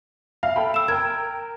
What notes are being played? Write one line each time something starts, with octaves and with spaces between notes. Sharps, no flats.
E5 F5
A4 G5 B5
E6 E7
A#4 G5 G#6